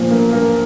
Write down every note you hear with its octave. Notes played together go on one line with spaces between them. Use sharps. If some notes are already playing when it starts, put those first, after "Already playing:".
Already playing: A#2 F3
A#3
A#3